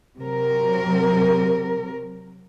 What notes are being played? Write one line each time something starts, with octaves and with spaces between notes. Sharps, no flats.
C3 F#3 A#4